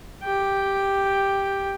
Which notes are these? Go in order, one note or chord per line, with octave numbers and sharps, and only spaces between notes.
G4 G5